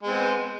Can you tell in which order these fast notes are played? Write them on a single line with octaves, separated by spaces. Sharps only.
G#3 C4 B3